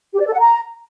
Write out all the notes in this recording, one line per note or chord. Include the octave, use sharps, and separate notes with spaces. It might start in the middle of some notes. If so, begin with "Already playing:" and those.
G4
D5
A4
F#5
A#5